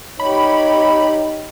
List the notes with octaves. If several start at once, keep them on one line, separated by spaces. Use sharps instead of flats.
D#4 G4 C#5 B5